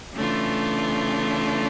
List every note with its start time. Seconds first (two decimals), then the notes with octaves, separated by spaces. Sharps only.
0.14 C#3 E3 A3 D4 F4